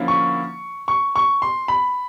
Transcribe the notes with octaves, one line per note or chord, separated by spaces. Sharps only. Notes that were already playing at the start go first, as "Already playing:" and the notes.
Already playing: D3 F3 A#3 C#4 E4
C#6
C#6
C#6
C6
B5